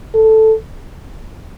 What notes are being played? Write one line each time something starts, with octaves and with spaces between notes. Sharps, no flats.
A4